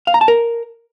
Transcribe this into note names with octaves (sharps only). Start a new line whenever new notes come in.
F5
A#5
A5
A#4